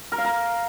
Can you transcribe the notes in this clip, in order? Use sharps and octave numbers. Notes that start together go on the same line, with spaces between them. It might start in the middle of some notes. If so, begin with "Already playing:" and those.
A#4
F5
A#4